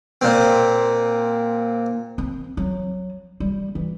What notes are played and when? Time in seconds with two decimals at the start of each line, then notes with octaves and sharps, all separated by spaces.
0.21 A#2 C4
2.18 C4
2.57 F#3
3.40 G3
3.75 E3